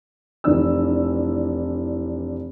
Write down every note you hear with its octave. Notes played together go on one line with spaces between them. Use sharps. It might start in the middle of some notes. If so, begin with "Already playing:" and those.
F1 E3 D4 E6